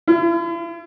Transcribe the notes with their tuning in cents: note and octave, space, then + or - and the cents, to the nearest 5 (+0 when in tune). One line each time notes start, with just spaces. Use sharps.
E4 +45